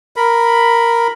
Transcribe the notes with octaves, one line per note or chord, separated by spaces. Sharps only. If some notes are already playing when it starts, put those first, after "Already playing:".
A#4 B5